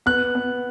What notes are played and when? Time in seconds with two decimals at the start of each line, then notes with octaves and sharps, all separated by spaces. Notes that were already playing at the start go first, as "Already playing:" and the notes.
0.06 B3 F#6
0.35 B3